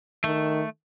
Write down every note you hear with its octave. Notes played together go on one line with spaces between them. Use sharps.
D#3 A3